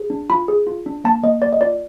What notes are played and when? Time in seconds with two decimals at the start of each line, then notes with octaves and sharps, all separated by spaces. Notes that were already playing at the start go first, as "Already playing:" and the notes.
Already playing: G#4
0.10 D4
0.30 F4 B5
0.48 G#4
0.67 F4
0.86 D4
1.04 A#3 A5
1.23 A#3 D#5
1.42 A#3 D5
1.53 D#5
1.61 F4 D5